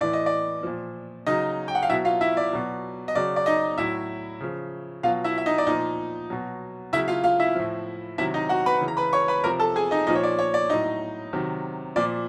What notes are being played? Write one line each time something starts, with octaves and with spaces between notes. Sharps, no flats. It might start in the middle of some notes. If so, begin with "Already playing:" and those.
A2 E3 D5
D#5
D5
A#2 F3
C#3 F#3 D#4 D#5
G5
F#5
F5
B2 F#3 E4 E5
F4 F5
E4 E5
D5
B2 F#3
D#5
C#3 F#3 D5
D5
D#4 D#5
A2 F#3 E4 E5
C#3 F3
B2 F#3 F4 F5
E4 E5
E5
D#4 D#5
D5
A#2 F3 D#4 D#5
B2 F#3
C#3 F#3 E4 E5
F4 F5
F4 F5
E4 E5
A2 F3
C3 D#3 F#3 E4 E5
D#4 D#5
F#4 F#5
B4 B5
C#3 E3
A#5
B4 B5
C#5 C#6
B4 B5
C3 F3 A#4 A#5
A4 A5
G#4 G#5
D#4 D#5
A#2 F3 D#4 D#5
C#5
D5
C#5
D5
A2 F#3 D#4 D#5
C3 D#3 F#3
A#2 F3 D5